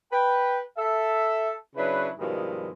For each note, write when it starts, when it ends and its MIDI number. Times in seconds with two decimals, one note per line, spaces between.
0.12 0.59 71
0.12 0.59 79
0.78 1.51 69
0.78 1.51 76
1.76 2.09 49
1.76 2.09 54
1.76 2.09 62
1.76 2.09 64
1.76 2.09 71
2.19 2.70 43
2.19 2.70 47
2.19 2.70 51
2.19 2.70 53
2.19 2.70 56
2.19 2.70 64